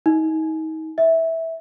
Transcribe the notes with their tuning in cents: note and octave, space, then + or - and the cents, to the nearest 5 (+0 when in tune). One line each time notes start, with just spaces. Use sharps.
D#4 +30
E5 -10